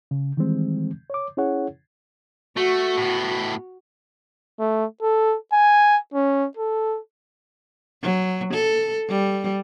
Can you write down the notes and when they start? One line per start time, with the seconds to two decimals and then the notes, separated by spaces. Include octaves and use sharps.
0.11 C#3
0.37 D#3 E3 G3 G#3 C4
1.10 C#5 D6
1.37 C#4 E4 G#4 C#5 F#5
2.57 A3 F#4
2.98 A2 B3
4.60 A3
5.02 A4
5.53 G#5
6.14 C#4
6.57 A4
8.03 F#3
8.54 A4
9.09 G3